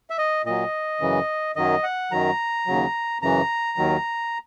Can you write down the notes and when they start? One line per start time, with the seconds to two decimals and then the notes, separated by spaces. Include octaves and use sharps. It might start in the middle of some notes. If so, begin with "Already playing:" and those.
0.10 E5
0.18 D#5
0.45 A#2 F#3 D#5
1.01 F#2 C#3 E3
1.56 F#2 D#3 F#3 D#5
1.83 F#5
2.12 F#2 D#3 F#3 A#5
2.67 D#2 C#3 F#3
3.22 F#2 C#3 E3 A#5
3.77 D#2 D#3 F#3